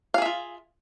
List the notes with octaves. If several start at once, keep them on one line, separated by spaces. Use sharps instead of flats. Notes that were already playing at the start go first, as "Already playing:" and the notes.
F4 G#4 E5 F5